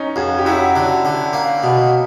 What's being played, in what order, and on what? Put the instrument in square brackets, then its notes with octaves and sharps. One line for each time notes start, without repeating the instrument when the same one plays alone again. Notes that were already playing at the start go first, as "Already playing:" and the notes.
Already playing: [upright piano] C#4 D#4
[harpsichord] F2 [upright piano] F#4 G#4
[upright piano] G4
[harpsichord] F#3 [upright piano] E4 F#4
[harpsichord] D3
D3
A#3
B2